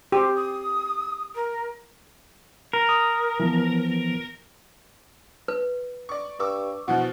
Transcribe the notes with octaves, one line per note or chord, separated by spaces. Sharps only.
G4 C5
D#6
A#4
A#4
D#6
E3 F3 B3
B4
D5 C#6
G2 C#6 D6 E6
B2 E3 F3 F#4